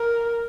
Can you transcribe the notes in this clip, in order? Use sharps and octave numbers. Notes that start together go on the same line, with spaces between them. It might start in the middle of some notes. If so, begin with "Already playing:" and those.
Already playing: A#4